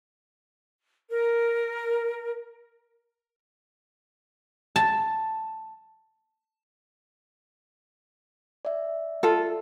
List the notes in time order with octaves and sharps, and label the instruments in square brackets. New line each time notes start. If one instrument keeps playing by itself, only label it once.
[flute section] A#4
[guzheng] A5
[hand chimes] D5 E5
[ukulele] F4 A4